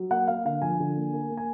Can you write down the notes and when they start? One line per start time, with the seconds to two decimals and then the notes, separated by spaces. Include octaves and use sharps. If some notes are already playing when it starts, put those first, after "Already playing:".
Already playing: F#3
0.11 A#3 F#5
0.28 A#3 F5
0.45 D3 F5
0.62 F3 G#5
0.80 D3
0.97 A#3
1.13 A#3
1.30 A#3
1.37 G#5